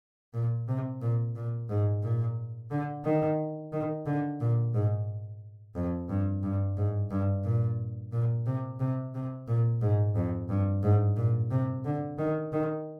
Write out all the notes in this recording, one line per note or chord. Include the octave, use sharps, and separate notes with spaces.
A#2
C3
A#2
A#2
G#2
A#2
D3
D#3
D#3
D3
A#2
G#2
F2
G2
G2
G#2
G2
A#2
A#2
C3
C3
C3
A#2
G#2
F2
G2
G#2
A#2
C3
D3
D#3
D#3